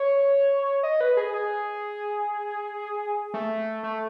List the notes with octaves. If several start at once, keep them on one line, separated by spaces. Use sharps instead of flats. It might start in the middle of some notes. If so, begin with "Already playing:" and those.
Already playing: C#5
D#5
B4
G#4
G#4
A3
A3